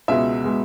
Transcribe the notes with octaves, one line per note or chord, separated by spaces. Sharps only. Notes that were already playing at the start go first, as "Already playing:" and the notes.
C#2 B2 G#3 E5
B2 G#3